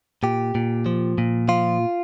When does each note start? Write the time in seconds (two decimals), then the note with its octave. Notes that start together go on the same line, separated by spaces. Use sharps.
0.23 A#2 G4
0.55 A#2
0.86 F3
1.18 A#2
1.48 F3 F4